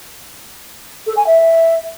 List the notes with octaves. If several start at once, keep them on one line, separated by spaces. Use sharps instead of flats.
A4
G#5
E5